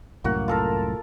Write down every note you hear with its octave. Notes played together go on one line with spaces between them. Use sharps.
C2 F#2 A2 A#3 F#4
F4 A4 A#4